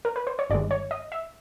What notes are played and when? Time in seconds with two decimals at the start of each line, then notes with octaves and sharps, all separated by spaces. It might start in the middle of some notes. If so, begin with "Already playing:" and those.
0.05 A#4
0.16 B4
0.27 C5
0.39 C#5
0.50 G1 G2 D#3 G#3 D5
0.71 C#5
0.91 D#5
1.12 E5